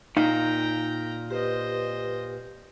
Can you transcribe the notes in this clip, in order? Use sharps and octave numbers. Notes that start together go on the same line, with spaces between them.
A#2 D#4 F5 G5 A#5
G4 B4 C5 D#5